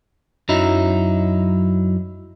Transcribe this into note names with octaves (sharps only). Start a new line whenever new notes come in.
F#2 F#3 D#4 E4